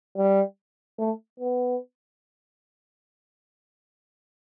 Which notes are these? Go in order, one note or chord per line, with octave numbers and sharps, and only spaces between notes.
G3
A3
B3